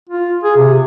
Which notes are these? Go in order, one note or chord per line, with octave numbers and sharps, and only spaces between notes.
F4
G#4
C3